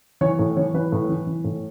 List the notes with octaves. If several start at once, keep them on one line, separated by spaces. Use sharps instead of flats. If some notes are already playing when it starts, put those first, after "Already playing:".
E3 C#5
A2
E3 C#5
E3 B4
A2
E3
E3
A2